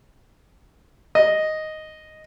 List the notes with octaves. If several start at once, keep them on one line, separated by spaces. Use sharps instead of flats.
D#5